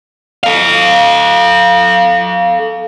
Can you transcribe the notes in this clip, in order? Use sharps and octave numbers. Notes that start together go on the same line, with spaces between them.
A4 F5